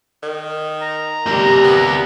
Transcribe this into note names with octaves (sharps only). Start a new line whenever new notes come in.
D#3
A#5
C3 G3 G4 A#4
B3